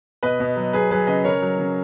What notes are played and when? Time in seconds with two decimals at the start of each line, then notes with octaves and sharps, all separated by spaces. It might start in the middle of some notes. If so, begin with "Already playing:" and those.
0.23 B2 B4 D#5
0.40 B2
0.56 F#3
0.73 F#3 G#4 B4
0.91 F#3 G#4 B4
1.07 C#3 B4 D#5
1.24 C#3 A#4 C#5
1.42 F#3
1.59 C#3